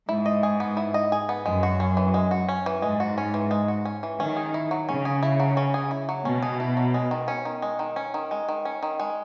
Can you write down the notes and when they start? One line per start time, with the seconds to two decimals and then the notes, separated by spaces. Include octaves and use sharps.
0.09 G#2 E4
0.26 D#5
0.43 G#4
0.60 B3
0.77 E4
0.94 D#5
1.12 G#4
1.29 B3
1.46 F#2 G#3
1.63 F#4
1.80 C#4
1.97 E3
2.14 G#3
2.31 F#4
2.49 C#4
2.66 E3
2.82 G#2 G#3
3.00 F#4
3.18 C#4
3.34 E3
3.51 G#3
3.68 F#4
3.85 C#4
4.03 E3
4.20 D#3 C#4
4.37 G#4
4.54 E4
4.71 F#3
4.88 C#3 C#4
5.05 G#4
5.23 E4
5.40 F#3
5.57 C#4
5.74 G#4
5.91 E4
6.09 F#3
6.25 B2 C#4
6.42 G#4
6.60 E4
6.77 F#3
6.94 G#3
7.11 D#3
7.28 C#4
7.45 D#3
7.62 G#3
7.79 D#3
7.96 C#4
8.14 D#3
8.31 G#3
8.49 D#3
8.65 C#4
8.83 D#3
9.00 G#3